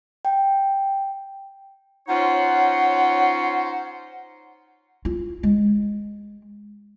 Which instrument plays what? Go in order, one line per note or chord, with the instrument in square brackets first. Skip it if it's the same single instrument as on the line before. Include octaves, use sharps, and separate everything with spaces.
[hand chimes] G5
[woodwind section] C#4 D#4 F4 C5 C#5 F#5
[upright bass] F4
G#3